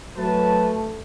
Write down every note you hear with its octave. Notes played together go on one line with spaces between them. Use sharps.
F#3 A3 B4 A5